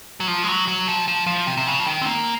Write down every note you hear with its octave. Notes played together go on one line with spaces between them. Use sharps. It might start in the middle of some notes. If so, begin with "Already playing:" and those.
F#3
F3
G#3
F#3
F#3
F3
F3
F3
C3
C3
C#3
F3
D#3
C4
A#3